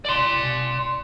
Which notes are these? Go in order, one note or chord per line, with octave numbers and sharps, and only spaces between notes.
D5 C6